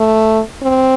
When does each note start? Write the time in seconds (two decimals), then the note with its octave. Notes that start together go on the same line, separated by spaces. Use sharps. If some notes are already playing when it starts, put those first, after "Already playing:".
Already playing: A3
0.62 C4